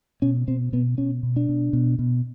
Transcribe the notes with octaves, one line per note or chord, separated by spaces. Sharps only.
B2 C#4
B2 C4
B2 B3
B2 C#4
B2
D4
B2
B2
B2